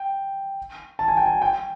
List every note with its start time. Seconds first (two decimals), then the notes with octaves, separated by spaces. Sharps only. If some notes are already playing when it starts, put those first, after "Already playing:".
Already playing: G5
0.99 A5
1.08 G#5
1.17 G5
1.26 G#5
1.42 G5